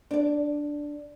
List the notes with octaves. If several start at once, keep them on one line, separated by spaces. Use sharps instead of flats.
D4 D5